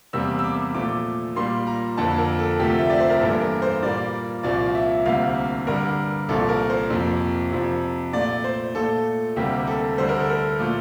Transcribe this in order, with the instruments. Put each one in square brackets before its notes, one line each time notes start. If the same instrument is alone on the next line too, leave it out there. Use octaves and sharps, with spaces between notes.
[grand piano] E2 C3 G3 A#3 E6
E6
D6
A#2 F3 A3 D6
A#2 G3 A#3 C6
A#5
F2 D3 F3 A#3 A5
A#4
A4
D2 C3 F3 A3 G4
E5
D5
C5
A#4
G2 E3 A#3 A4
A#4
C5
A#2 G3 A#3 D5
C2 A#2 F3 A#3 D5
E5
D2 C3 G3 A#3 F5
G2 D3 G3 A#4
C2 A#2 F3 A4
A#4
C5
F2 C3 F3 A#3
F2 C3 F3
A#2 A3 D5
C5
A#2 A3 A4
D2 C3 G3 A#3 G4
A4
D2 D3 G3 C5
A#4
A4
A#4
A#2 F3 A3